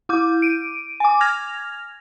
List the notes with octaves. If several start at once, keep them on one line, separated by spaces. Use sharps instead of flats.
E4 D6 G6
D7 D#7
G#5 D6
F6 G#6 A#6 F7